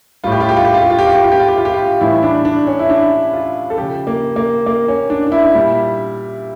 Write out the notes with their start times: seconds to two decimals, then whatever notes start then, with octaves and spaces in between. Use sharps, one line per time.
0.24 A2 G3 F4
0.32 G4
0.41 F4
0.49 G4
0.57 F4
0.65 G4
0.74 F4
0.81 G4
0.90 F4
0.99 G4
1.07 F4
1.15 G4
1.24 F4
1.32 G4
1.40 F4
1.48 G4
1.57 F4
1.65 G4
1.74 F4
2.01 A2 E3 G3 E4
2.23 D4
2.45 D4
2.67 C#4
2.79 E4
2.90 D4
3.33 F4
3.70 A4
3.77 C#3 F3 G4
4.07 A#3
4.36 A#3
4.66 A#3
4.88 C#4
5.10 D4
5.26 D4
5.32 E4
5.55 A#2 G3